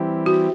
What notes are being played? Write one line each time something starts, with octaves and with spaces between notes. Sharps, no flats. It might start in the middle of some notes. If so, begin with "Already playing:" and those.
Already playing: E3 G3 C4 E4 G4
F#4